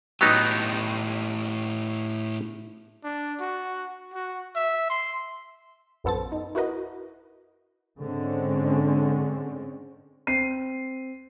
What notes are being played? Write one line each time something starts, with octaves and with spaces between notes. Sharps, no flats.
A2 F#3 B3 D#4 G4
D4
F#4
F#4
E5
C6
A#1 F#2 B3 A4 C5 A6
D#4
E4 F#4 A#4 B4 D#5
G#2 D3 G#3 C4 C#4
C4 C7 D#7